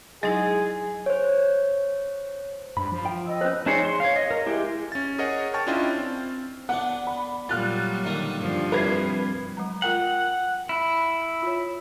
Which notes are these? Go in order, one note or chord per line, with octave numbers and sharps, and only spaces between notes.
F#3 G#3 D#4 E4 G#4
C5 C#5
G2 B5
F3
G5
D#5 E6
C#4 B4 C5
D4 D#4 G#4 C5 C#5
C6
C#5 F5
D#5
A#4
G#3 E4 G4
C#4 A6
G#4 A#4 C#5 D#5 F#5
G5 A5 C#6 F6 A6
C#4 D4 E4 F4 D#5 G5
C4
B3 D4 F#5
B5
A#2 F#3 G3 F4 F6 F#6 A6
D3 D#3 A#3
G2 F3
C2 A#4 B4 G#6 C7
F#3 G#3 A#5
F4 A#4 F#5 G5
E4
F4 C#5